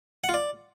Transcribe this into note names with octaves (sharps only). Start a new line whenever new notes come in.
F#5
F4
D5